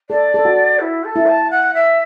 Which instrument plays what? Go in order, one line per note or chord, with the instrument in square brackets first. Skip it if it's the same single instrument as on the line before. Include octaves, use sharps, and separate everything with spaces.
[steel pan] A4 [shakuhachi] D5
[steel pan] A4
F#4
[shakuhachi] E4
A4
[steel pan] E4
[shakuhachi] A5
F#5
E5